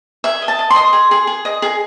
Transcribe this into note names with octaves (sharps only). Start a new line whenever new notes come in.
G#4 E5
D#5
A5
D#5
C6
D#5
G#4
G#4
G#4
D#5
G#4